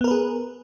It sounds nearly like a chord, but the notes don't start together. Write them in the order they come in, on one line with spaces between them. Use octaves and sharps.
B3 A#4 B4 G#4